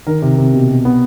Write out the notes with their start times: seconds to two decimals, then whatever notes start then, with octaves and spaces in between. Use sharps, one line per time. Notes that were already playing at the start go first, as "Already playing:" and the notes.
0.07 D#3 A#4
0.22 C3
0.38 C3
0.54 B2
0.69 B2
0.85 B3